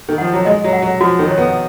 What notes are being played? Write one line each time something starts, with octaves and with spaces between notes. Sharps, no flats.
D#3
F3 F#5
F#3
G#3 D#5
F#3
F#5
F#3
F3 F#4
D#3
C#5
B3